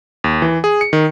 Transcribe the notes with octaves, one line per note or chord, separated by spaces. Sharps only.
D#2
E3
G#4
C#7
D#3